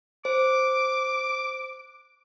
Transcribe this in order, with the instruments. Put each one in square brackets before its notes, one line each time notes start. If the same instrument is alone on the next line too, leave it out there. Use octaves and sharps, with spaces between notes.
[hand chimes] C5 [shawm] D6